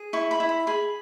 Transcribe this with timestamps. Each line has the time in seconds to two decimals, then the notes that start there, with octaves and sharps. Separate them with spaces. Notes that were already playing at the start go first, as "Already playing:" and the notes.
Already playing: G#4
0.13 E4 C#6
0.31 B5
0.40 E4
0.49 B5
0.67 G#4 B5